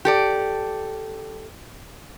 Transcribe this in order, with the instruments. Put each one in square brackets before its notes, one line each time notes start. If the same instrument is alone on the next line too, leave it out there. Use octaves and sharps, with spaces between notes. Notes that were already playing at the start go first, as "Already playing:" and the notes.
[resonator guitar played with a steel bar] G4 A4 D5